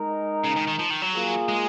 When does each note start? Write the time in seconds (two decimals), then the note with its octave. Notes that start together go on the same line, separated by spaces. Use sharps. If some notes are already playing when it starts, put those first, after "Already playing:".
Already playing: G#3 D#4 A#4
0.44 C#3
0.56 D#3
0.67 D#3
0.79 F3
0.90 D#3
1.02 F#3
1.14 A#3 F4 G#4
1.48 G#3